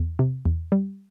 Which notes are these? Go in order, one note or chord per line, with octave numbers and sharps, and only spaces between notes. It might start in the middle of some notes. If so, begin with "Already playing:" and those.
Already playing: E2
C3
E2
G3